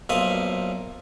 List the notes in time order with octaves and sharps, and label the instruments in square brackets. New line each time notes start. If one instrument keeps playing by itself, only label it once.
[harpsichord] B1 A#2 F3 E5 F5 D#6